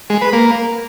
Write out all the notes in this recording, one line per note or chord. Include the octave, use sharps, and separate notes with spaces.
G#3
B4
A#3